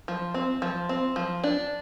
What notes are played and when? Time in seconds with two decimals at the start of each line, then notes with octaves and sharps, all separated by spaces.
0.08 F3
0.34 C4
0.62 F3
0.89 C4
1.16 F3
1.44 D4